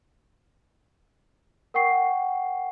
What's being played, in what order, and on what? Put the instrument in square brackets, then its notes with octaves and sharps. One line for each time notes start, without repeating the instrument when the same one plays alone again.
[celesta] A#4 F#5 G5 C#6 C7